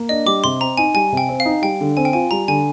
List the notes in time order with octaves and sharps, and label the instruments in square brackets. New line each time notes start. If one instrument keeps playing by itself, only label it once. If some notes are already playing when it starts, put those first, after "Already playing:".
Already playing: [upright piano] A#3
[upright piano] D4 [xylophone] D#5
[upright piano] G3 [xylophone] D6
[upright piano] C3 [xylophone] C6
[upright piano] C4 [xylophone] A#5
[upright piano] D#4 [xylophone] G#5
[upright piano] G3 [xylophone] G#5
[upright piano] C3
[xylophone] G5
[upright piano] C4
[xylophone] F5
[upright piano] D#4
[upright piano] G3 [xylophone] G5
[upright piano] D3
[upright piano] C4 [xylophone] G#5
[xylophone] G5
[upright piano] F4 [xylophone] G#5
[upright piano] G3 [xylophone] A#5
[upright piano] D3 [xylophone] G#5